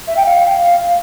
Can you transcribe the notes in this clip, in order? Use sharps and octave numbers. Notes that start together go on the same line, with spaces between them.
E5
G5
F5